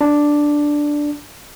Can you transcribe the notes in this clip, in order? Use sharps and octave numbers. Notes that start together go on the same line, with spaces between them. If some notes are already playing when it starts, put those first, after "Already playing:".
D4